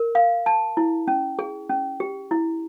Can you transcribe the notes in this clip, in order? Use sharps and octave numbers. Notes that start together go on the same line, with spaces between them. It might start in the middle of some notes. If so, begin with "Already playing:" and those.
Already playing: A#4
F5
A5
E4
C#4
G#4
C#4
G4
E4